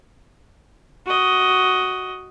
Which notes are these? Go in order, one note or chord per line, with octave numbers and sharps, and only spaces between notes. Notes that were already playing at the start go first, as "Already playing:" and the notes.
F#4 D#5